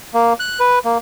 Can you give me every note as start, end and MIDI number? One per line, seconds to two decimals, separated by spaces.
0.14 0.33 58
0.40 0.60 90
0.60 0.79 71
0.85 0.98 58